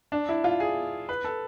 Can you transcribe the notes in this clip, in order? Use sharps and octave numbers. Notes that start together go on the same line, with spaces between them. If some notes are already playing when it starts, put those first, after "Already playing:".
D4
E4
F4
G#4
B4
A4